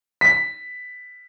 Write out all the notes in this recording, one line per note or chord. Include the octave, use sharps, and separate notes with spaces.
B6